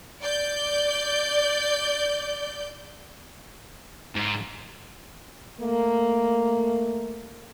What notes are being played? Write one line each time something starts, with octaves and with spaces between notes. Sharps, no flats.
D5 G6
G#2
A3 A#3